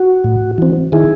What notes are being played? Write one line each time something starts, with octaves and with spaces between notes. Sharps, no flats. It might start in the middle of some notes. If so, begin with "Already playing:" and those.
Already playing: F#4
A2
E3 C4
D#3 E4 G#4